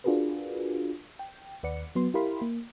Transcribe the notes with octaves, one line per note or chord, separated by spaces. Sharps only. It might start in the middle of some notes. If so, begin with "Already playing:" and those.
D4 F4 F#4 G#4 A#4 B4
G5
D#2 B4 D5 F#5 C#7
F#3 B3 C6
E4 G4 A#4 F5 B5 C6
A#3